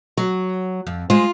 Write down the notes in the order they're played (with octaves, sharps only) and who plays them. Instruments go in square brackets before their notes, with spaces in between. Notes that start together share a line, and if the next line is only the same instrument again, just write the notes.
[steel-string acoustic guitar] F#3
[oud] F2
[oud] G#3 C5 [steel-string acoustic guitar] F4